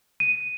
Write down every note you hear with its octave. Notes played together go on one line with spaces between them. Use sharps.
D#7